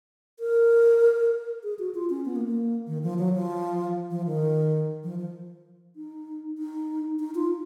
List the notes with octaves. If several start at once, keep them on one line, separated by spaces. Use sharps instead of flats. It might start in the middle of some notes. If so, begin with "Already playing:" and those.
A#4
G#4
F#4
F4
C#4
B3
A#3
A#3
D#3
F3
F#3
F3
F3
D#3
F3
F3
D#4
D#4
D#4
F4